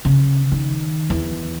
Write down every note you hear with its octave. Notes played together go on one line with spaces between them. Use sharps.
C#3
D#3
E2